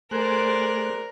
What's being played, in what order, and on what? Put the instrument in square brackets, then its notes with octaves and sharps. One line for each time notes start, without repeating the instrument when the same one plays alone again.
[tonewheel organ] A3 G#4 F#6 [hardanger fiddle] A#4 [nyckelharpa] C5 D5